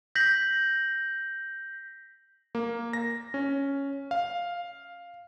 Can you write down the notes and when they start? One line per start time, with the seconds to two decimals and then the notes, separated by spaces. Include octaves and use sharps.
0.15 G6 A#6 B6 F#7
2.55 A#3
2.93 A#6
3.34 C#4
4.11 F5